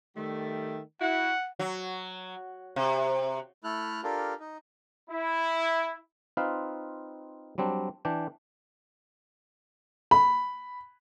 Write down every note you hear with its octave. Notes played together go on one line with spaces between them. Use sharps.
D#3 G3 A3
E4 F#4 F#5
F#3
C3
A3 E4 A4 F6 F#6
D4 F4 G4 A4 A#4
D#4
E4
C4 D#4 F4 B4 F5
F#3 G3 C4 D4
E3 D4 G5
B5